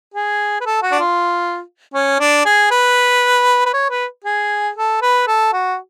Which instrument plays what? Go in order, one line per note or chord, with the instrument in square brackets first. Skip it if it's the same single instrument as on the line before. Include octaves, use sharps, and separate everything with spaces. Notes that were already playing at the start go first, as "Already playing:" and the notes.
[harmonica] G#4
B4
A4
F#4
D4
F4
C#4
D4
G#4
B4
B4
C#5
B4
G#4
A4
B4
A4
F#4